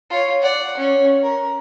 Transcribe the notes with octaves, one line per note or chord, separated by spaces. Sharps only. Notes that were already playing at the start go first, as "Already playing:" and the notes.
F4 C#5
D5 F#5
C#4
A#4